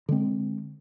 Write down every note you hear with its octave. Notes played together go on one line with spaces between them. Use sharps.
D3 G#3 C4